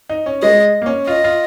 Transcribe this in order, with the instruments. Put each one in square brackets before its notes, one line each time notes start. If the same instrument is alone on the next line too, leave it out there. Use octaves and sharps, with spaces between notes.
[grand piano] D#4
C#4
[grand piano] G#3 [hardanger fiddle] D#5
[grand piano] A#3
C#4
[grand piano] F4 [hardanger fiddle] D#5
[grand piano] F4